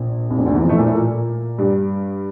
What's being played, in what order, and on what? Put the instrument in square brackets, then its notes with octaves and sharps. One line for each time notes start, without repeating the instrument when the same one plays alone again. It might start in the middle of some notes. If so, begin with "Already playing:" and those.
Already playing: [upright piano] A#1 A#2
C2 C3
A#1 A#2
D2 D3
E2 E3
F2 F3
A2 A3
A#2 A#3
A2 A3
A#2 A#3
G2 G3